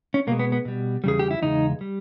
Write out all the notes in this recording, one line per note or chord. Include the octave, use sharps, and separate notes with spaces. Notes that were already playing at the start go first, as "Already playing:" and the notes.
C#4
B2 G#3 A#3
B3
B3
B2 G3
E2 C#3 G3 G#4
G4
E4
E2 C#3 G#3 D#4
G3